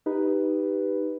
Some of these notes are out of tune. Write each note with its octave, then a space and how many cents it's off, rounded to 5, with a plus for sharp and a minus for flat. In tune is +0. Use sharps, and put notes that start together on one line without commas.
D#4 +0 G4 +0 B4 +0